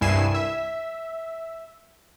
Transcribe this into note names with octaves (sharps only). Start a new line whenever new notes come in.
C2 G2 E4 G#5 C7 E7
E5